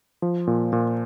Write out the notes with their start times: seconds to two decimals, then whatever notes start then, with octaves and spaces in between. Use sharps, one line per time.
0.22 F3
0.47 A#2
0.73 A#2